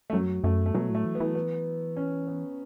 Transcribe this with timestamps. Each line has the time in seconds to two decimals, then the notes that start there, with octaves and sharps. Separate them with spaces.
0.10 A3
0.13 F#2 F#3
0.44 F#2 A3
0.66 A3
0.74 B2 F#3
0.90 A2 A3
1.05 E3
1.15 B3
1.20 E3
1.35 B3
1.97 C#4
2.27 B3